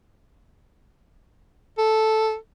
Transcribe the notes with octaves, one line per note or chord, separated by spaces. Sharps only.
A4